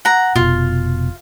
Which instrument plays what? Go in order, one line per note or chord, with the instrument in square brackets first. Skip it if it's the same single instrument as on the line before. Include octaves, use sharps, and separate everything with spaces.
[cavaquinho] F#5 A#5
[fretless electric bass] F1 B2 [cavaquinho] F4